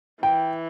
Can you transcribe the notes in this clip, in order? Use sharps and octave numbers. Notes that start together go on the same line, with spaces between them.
E3 G5